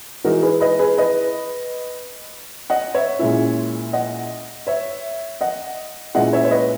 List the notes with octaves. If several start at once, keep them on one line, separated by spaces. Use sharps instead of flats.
E3 G#3 D#4 F#4 A#4
G#4 B4
B4 D#5
G#4 B4
B4 D#5
D#5 F#5
C#5 E5
A#2 G#3 C#4 E4
D#5 F#5
C#5 E5
D#5 F#5
A#2 G#3 C#4 E4 D#5 F#5
C#5 E5
C#5
B4 D#5